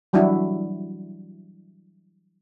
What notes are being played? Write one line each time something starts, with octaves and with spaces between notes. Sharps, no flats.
E3 F#3 G3 D4 E4 F#4